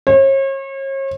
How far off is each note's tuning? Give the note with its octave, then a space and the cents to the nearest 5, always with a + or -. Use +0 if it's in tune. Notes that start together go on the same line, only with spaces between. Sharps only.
C#5 -40